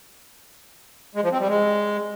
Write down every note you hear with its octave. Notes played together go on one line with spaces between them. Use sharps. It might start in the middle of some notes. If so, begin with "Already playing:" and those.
G#3
F3
C4
G3
G#3